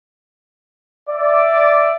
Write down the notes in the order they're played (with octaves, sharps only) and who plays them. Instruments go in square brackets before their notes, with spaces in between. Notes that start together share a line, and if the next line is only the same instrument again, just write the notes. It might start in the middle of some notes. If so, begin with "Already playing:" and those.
[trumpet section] D5 E5